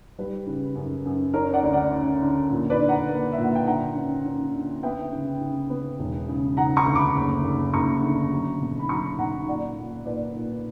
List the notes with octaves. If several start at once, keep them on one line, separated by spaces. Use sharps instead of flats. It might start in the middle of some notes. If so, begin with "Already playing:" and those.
G3 B4
C#3
F#2
F#2
C#4 A#4 C#5
D5 F#5
D2
D5 F#5
C#4
D3
A#2
B4 D5
D4
F#5 A#5
A#3
E5
A#2
F#5
G5
D3 F#5 A#5
C#4
C#4
D3
B3 E5 G5
C#3
C#3
B3
E1
C#3
C#3 F#5 A#5
A#5 C#6
D2
B5 D6
F#1
F#1
F#1 A#5 C#6
D3
F#3
B2
B5
F#3 A#5 C#6
B1 F#5 A#5
A#2 D5 F#5
A#2
A#2 B4 D5
A#2